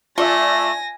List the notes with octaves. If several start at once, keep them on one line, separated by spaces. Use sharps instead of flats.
A3 F4 D5 E5 G#5 A#6